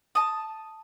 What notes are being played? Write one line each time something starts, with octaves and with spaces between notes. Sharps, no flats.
A5 D#6